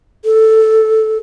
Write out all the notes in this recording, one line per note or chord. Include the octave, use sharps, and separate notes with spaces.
A4